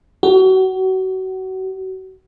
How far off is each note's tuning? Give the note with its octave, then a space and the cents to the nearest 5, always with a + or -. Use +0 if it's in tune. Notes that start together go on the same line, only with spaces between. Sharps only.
F#4 +30